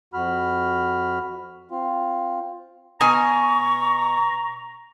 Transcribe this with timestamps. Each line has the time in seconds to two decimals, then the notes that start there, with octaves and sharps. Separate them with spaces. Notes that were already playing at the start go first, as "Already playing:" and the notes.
0.14 F2 F#4 B5 F6
1.71 C4 F4
3.01 B2 G#5 A#5 C#6